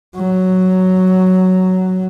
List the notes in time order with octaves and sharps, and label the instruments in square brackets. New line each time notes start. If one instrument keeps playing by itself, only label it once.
[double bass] F#3